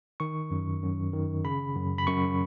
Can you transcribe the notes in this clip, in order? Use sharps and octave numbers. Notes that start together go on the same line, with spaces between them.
D#3 C#6
F#2
F#2
D#3
C#3 B5
F#2
B5
F#2 C#6